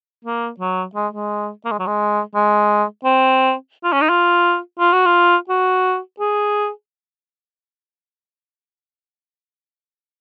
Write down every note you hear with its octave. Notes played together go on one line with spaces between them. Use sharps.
A#3
F#3
G#3
G#3
A#3
G#3
F#3
G#3
G#3
C4
F4
C#4
D#4
F4
F4
F#4
F4
F#4
G#4